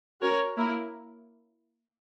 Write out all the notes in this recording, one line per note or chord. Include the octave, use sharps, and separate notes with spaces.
C#4 F#4 A#4 C#5
A#3 E4 A#4